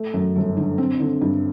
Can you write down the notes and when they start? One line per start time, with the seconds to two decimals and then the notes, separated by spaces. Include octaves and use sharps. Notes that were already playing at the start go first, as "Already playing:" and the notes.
Already playing: A3
0.14 F#2
0.36 G1
0.57 D3
0.78 C4
1.00 D3
1.22 G2